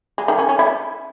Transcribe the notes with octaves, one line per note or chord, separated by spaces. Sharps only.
G#3
D#3
C#4
C#4
E4